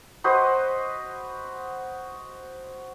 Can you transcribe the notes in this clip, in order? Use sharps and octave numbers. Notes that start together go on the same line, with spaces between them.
F#4 B4 C5 D#5